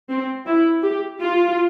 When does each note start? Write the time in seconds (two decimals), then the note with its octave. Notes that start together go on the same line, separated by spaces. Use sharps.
0.10 C4
0.47 E4
0.84 G4
1.22 F4